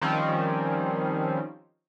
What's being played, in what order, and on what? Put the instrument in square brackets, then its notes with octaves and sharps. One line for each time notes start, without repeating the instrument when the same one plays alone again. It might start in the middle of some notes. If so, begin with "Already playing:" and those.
[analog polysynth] D#3 F3 G3 C4 C#4